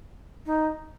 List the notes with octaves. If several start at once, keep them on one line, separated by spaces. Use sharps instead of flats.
D#4